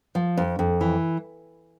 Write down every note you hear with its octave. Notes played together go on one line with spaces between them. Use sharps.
F3
F2
F2
E3